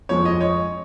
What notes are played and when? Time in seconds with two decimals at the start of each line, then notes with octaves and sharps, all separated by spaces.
0.09 F2 F3 G#3 C#5
0.25 D#5
0.41 C#5